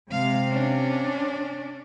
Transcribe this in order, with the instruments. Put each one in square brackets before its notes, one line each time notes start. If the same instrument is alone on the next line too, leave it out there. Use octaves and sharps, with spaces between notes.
[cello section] C3 [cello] G#3 F5
[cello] C#4 D4